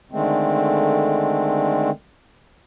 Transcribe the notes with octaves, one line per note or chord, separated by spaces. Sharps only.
D3 D#3 G#3 A3 C4